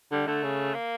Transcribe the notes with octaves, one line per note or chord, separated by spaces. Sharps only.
D3 G3
D3 A3
C#3
A#3